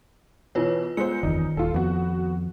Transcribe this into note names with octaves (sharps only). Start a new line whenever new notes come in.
B2 E3 F4 B4 C#5
G#3 B3 F4 C5 C#7
F#1 E2 D#3 D#4
D#1 F4 A4
F2 B3 F#4